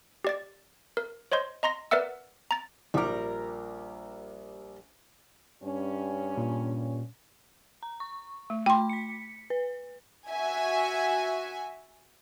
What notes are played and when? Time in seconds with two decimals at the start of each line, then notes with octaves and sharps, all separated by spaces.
0.25 G4 D5 A6
0.97 A#4
1.32 C5 C#5 D#5 C6 G6
1.63 D#5 A#5 C6 A#6
1.91 A#4 B4 D5 E5 F#5 E6
2.51 A#5 A6
2.94 A#1 G3 A#4 D6
5.62 G2 C#4
6.38 A#2
7.83 A#5
8.00 C#6
8.50 A3
8.66 A3 G5 B5 C6 D6
8.89 B6 C#7
9.50 B4
10.29 F#4 E5 G#5